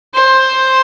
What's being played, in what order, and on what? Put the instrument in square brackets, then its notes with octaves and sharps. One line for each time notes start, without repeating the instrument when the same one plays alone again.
[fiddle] C5